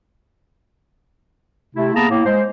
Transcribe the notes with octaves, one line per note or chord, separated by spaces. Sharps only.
C3 A3 E4
A#3 B3 G#4 A5 A#5
A2 A#3
G#3 C5